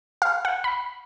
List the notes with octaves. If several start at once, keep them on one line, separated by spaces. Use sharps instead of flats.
F5
F#5
B5